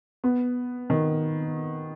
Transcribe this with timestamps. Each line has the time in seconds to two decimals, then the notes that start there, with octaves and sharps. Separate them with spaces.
0.24 B3
0.90 D#3